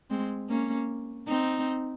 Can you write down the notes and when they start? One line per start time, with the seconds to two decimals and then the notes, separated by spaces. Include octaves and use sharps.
0.10 G#3 C4
0.49 A#3 C#4
1.28 C4 D#4